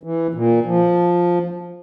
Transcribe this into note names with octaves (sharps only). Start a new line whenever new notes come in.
E3
A#2
F3